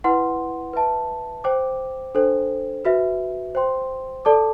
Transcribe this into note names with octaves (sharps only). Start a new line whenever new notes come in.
E4 B4 F#5 C6
B4 E5 A5
C5 G5 D6
D4 A4 C5 G5
F#4 B4 E5
C5 G5 C6
A4 D5 A5 D6